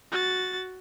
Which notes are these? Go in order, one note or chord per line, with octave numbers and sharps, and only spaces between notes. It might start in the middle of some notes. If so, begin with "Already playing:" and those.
F#4 A6